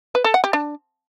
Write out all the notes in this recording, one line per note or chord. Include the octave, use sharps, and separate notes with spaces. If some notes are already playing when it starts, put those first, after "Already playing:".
B4
A4
F#5
G4
D4